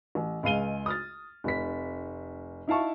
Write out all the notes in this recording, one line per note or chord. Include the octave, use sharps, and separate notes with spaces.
A1
C#2 G#3 F5 D#7 G7
D#6 F6 A6
F1 B6
D#4 E4 F5 A5 C#6